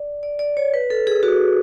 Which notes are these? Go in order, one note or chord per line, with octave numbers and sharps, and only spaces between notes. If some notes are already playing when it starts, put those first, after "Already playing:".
Already playing: D5
D5
D5
C#5
B4
A4
G#4
F#4